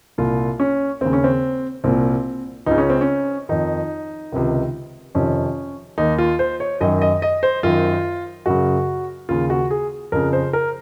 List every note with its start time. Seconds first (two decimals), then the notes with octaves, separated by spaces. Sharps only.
0.18 C2 A#2 F4
0.60 C#4
1.01 D#2 C#3 C4
1.13 C#4
1.24 C4
1.84 C2 A#2 C4
2.66 C#2 C#3 D#4
2.78 C#4
2.90 C4
3.01 C#4
3.49 F2 D#3 D#4
4.32 C#2 C3 D#3
5.15 F2 C3 D#3 C#4
5.98 D#2 D#3 D#4
6.18 F4
6.39 C5
6.60 C#5
6.81 F#2 D#3 D#5
7.02 D#5
7.22 D#5
7.43 C5
7.63 F#2 D#3 F4
8.46 F#2 C#3 F#4
9.29 D#2 C#3 F4
9.50 F#4
9.71 G#4
10.12 F2 C#3 A#4
10.33 C5
10.53 A#4